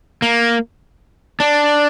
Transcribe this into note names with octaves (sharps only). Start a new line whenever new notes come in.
A#3
D4